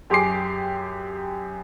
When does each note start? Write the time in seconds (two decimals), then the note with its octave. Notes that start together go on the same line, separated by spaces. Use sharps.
0.10 F#2 G4 G#4 C6 D6 C7